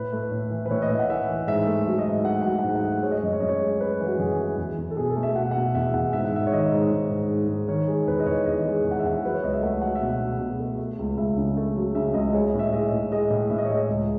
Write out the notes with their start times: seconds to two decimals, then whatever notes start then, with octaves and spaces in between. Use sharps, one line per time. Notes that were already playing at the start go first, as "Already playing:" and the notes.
Already playing: A2 B4
0.12 A3
0.31 A2
0.50 E3
0.66 B4
0.70 A2 C#5
0.82 D#5
0.90 A2 E5
0.99 F#5
1.10 E3 E5
1.29 E3
1.47 G#2 E5
1.67 A3
1.86 F#3 E5
1.99 D#5
2.06 G#2 E5
2.25 A3 F#5
2.42 F#3 F#5
2.59 F#5
2.64 G#2
2.76 F#5
2.83 A3
3.03 G#3 C#5
3.11 D#5
3.18 C#5
3.23 F#2 D#5
3.33 C#5
3.40 F#2 D#5
3.49 C#5
3.61 G#3
3.80 G#3 B4
4.00 E3
4.06 F#4
4.19 F#2 G#4
4.39 E3
4.58 E2
4.78 E2
4.91 A4
4.97 B2 G#4
5.10 A4
5.16 A3
5.23 E5
5.35 B2 F#5
5.43 E5
5.51 F#5
5.55 B2
5.75 E2 E5
5.94 E2 F#5
6.13 G#2 E5
6.25 F#5
6.32 G#2 E5
6.47 C#5
6.53 D#3 D#5
6.72 G#2
6.91 G#2
7.10 G#2
7.30 G#2
7.49 G#2
7.68 D#3 C#5
7.88 G#3
8.07 E2 B4
8.20 D#5
8.26 E2 C#5
8.45 E2 D#5
8.66 G#3
8.84 E2
8.91 F#5
8.99 E5
9.04 E2 F#5
9.24 F#3 B4
9.34 C#5
9.43 C#2 D#5
9.53 E5
9.62 A3 F#5
9.82 F#3 F#5
9.95 E5
10.01 B2
10.09 F#5
10.20 B2
10.39 B2
10.59 A3
10.78 A3
10.99 C#2
11.17 C#2 E5
11.38 C#3
11.57 A3
11.76 F#3
11.95 C#3 E5
12.14 C#2 D#5
12.34 G#3 C#5
12.47 D#5
12.54 A2
12.59 E5
12.72 G#3 D#5
12.92 A2
13.12 G#3 D#5
13.30 A2
13.50 A2 E5
13.58 D#5
13.65 C#5
13.69 G#3 D#5
13.89 C#2